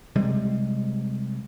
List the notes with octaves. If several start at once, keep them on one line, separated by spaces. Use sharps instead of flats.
C3 G3 G#3